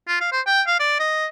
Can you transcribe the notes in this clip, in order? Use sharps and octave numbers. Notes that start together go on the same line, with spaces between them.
F4
F5
C5
G5
F5
D5
D#5